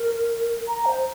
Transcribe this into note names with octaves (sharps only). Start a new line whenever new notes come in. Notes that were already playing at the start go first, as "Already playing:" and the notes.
Already playing: A#4
A#5
C5